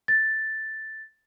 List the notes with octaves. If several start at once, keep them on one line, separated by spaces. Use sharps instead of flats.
A6